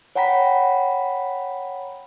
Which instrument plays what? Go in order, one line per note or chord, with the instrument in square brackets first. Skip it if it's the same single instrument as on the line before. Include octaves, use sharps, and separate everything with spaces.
[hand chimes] C#5 F#5 G5 A#5 B5 B6